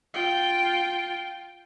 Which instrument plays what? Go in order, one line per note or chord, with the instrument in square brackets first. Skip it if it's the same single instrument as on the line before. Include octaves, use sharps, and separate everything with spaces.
[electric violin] F4 G5